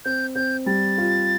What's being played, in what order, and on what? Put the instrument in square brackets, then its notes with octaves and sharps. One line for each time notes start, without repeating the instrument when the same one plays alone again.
[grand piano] C4 [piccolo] G6
[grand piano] C4 [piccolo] G6
[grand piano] G3 [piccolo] A6
[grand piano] F4